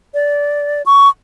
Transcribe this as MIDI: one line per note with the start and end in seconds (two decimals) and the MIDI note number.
0.14 0.82 74
0.86 1.08 85